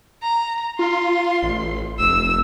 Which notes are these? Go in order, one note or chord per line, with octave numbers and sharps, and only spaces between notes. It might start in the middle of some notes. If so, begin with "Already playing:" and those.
A#5
F4 C6
A1
F1 E6